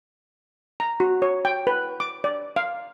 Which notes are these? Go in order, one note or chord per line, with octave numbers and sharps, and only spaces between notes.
A#5
F#4
C#5
G5
B4
D6
D5
F5